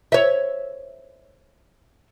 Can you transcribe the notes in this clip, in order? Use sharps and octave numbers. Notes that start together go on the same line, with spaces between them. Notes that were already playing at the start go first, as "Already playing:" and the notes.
C#5 E5